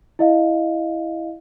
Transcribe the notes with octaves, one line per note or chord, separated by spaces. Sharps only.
E4 D#5 F5